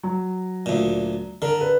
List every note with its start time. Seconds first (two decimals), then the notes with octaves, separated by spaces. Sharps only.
0.03 F#3
0.66 D2 A#2
1.42 D3 A#4
1.61 B4